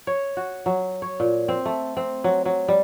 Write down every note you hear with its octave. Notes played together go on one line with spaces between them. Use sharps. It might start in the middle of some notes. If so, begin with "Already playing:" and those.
C#5
F#4
F#3
C#5
A#2
C4
A3
C4
F#3
F#3
G3